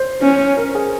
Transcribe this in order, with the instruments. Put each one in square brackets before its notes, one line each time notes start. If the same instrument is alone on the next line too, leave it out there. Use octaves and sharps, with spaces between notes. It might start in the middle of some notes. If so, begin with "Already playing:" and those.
Already playing: [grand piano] C5
[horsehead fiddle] C#4
[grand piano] A#4
G#4